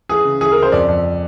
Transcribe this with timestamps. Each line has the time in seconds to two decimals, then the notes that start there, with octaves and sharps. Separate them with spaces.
0.09 E3 G#4
0.25 C#3
0.41 E3 G#4
0.52 A#4
0.57 C#3
0.63 C5
0.72 F2 D5
0.88 F2